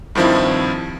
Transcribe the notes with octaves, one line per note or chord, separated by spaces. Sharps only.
G2 D#3 F3 C4 E4